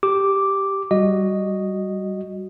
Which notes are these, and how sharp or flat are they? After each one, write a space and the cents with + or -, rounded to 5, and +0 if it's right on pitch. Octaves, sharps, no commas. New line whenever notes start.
G4 +0 D6 +0
G3 -15 F#4 +0 D#5 -5